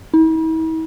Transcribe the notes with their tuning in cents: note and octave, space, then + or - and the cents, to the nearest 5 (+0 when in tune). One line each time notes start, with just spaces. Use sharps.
E4 -45